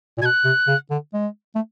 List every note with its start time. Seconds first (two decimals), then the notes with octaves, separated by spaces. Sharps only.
0.18 A#2
0.22 B2 G#6
0.25 F#6
0.45 C3
0.68 C#3
0.90 D3
1.14 G#3
1.55 A3